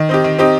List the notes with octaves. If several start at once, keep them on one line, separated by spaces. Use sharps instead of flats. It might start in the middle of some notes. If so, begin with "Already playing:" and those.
Already playing: D#3
C4 D#4 G4
D#3
C4 D#4 G4